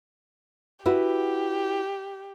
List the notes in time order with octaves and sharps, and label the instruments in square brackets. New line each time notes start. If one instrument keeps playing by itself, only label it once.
[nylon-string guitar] E4 F#4 B4 [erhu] G4